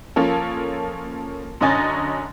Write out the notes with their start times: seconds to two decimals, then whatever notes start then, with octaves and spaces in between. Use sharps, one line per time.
0.16 F3 A#3 C#4 A4
1.61 F#2 D3 C#4 D#5 G#5 A6